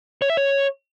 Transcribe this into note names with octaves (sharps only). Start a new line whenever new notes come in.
C#5
E5
C#5